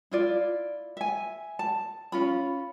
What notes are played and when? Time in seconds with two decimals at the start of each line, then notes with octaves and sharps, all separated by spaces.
0.11 E4 F4 D5
0.97 E5 G#5
1.59 A5
2.12 C#4 F4 B5